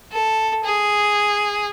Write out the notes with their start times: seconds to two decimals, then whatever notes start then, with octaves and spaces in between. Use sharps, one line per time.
0.12 A4
0.64 G#4